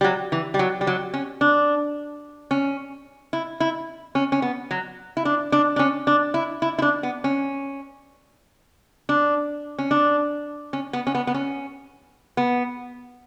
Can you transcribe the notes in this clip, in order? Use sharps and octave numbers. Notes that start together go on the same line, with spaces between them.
G3
F#3
E3
G3
F#3
G3
F#3
C#4
D4
C#4
E4
E4
C#4
C#4
B3
F#3
E4
D4
D4
D4
C#4
D4
E4
E4
E4
D4
B3
C#4
D4
C#4
D4
C#4
B3
C#4
B3
B3
C#4
B3